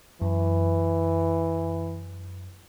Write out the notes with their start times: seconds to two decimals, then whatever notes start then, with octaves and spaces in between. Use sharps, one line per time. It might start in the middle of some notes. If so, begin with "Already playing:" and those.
0.22 F#2 E3